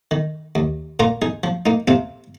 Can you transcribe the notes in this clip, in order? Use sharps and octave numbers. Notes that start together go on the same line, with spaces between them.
D#3
D#2
A#2 F4 A#4
D#4 G#4
F3
A#3 D#4
C3 C4 F4